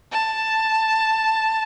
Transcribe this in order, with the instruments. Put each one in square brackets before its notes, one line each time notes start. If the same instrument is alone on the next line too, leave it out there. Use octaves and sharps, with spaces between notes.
[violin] A5